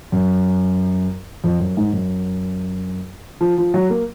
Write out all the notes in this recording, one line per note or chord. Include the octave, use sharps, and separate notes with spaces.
F#2
F2
F#2
G#2
F#2
F3
F3
F#3
A#3